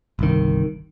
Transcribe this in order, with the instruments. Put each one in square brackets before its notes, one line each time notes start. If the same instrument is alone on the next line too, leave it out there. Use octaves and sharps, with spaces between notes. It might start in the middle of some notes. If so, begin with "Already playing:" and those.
[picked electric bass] G1 C2 D#3